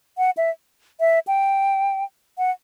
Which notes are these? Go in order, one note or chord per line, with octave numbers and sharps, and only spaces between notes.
F#5
E5
E5
G5
F#5